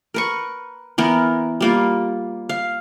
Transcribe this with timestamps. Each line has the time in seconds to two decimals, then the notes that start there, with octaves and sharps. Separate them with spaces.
0.14 A#4 B4 C#6
0.98 E3 B3 A#4
1.60 G3 A#3 F4
2.49 F5